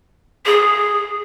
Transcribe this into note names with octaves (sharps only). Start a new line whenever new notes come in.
G#4